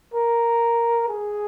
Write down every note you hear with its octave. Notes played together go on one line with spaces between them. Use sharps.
A#4
G#4